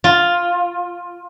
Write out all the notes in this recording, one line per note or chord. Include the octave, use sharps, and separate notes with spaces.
F4